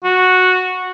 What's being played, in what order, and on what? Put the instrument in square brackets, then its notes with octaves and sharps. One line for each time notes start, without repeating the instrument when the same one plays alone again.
[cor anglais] F#4